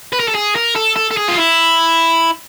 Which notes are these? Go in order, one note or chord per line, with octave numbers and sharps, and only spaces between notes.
B4
A#4
A4
G#4
A#4
A4
A4
A4
G#4
F4
E4